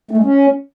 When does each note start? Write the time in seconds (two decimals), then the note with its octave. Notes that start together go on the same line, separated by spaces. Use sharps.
0.11 A3
0.17 G#3
0.23 C#4